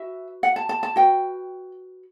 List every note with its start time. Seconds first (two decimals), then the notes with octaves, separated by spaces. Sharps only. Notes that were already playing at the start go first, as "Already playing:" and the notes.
Already playing: F#4 B4 E5
0.43 F#5
0.56 A5
0.69 A5
0.83 A5
0.96 F#4 B4 G5